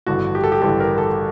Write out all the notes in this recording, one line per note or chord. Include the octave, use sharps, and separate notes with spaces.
A1 G2 D3 F#4
G4
A4
G4
A1 G2 D3 A4
A#4
A4